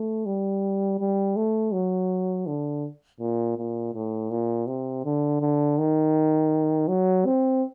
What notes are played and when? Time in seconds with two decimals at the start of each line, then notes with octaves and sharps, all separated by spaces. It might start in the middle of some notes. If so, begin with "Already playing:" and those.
Already playing: A3
0.26 G3
0.99 G3
1.36 A3
1.73 F#3
2.47 D3
3.20 A#2
3.57 A#2
3.93 A2
4.31 A#2
4.67 C3
5.05 D3
5.41 D3
5.78 D#3
6.88 F#3
7.25 C4